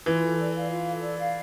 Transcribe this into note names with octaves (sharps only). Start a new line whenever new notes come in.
E3 F4
A4
D5
F5
F4
A4
D5
F5